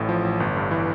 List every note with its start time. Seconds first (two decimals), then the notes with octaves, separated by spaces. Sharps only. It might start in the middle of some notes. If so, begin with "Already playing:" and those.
Already playing: A1 A2
0.09 F3
0.24 A1
0.40 G1
0.56 G2
0.71 E3